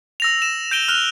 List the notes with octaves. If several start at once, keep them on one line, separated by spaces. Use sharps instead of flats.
E6 A#6 F7
E7
G6 A#6 D7 D#7 G7
F6 F#6 F7 G7